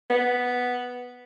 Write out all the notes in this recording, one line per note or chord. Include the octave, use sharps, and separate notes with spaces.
B3